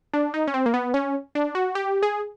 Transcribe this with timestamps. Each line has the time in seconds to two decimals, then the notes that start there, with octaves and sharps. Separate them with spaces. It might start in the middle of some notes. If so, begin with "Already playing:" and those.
0.14 D4
0.34 D#4
0.47 C#4
0.54 C4
0.66 A#3
0.74 B3
0.94 C#4
1.35 D4
1.55 F#4
1.75 G4
2.03 G#4